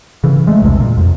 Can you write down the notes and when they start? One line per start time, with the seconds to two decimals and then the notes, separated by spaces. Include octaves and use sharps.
0.24 C#3 E3
0.47 G#3 A3
0.61 B1 E2 G2 C3
0.80 A#2
0.98 F2